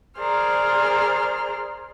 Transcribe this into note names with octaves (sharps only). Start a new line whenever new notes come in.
G#4 A#4 C5 D5 F6